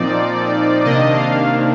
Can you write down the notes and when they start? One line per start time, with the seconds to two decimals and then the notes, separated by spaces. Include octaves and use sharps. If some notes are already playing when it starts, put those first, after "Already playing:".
Already playing: A#2 F3 C4 D#4 D5
0.85 C3 D#3 A#3 D4 D#5
1.16 F5